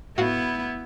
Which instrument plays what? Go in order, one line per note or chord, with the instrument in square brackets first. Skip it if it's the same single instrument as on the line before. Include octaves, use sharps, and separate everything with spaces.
[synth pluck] A2 F#4 F5 [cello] B3 E4